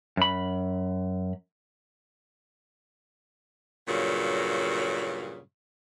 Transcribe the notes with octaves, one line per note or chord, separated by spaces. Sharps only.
F#2 B5
G2 A#2 C#3 F#3